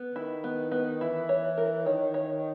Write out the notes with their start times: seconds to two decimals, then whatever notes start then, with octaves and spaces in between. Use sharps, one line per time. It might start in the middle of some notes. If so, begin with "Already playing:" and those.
Already playing: B3
0.15 D#3 E4
0.44 B3
0.72 B3
1.01 E3 E4
1.29 C#5
1.57 A#4
1.86 D#3 C#5
2.14 C#5